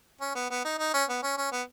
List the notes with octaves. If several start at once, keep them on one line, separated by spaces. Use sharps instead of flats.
C#4
B3
B3
D#4
D#4
C#4
B3
C#4
C#4
B3